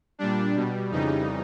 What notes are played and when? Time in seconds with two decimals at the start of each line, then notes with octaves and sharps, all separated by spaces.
0.19 A#2 G3 D4
0.55 B2 G3
0.90 F2 C#3 E3 G3 D#4